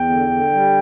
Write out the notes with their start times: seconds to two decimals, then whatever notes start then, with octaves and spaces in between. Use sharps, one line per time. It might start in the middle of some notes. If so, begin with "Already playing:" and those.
Already playing: E2 G5
0.10 D3
0.31 D3
0.52 G3